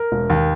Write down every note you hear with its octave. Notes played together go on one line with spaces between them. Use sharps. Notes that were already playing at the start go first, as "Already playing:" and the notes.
Already playing: A#4
E1
D#2